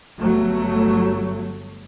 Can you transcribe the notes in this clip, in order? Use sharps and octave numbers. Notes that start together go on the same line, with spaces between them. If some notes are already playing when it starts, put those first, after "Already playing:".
G1 F#3 A3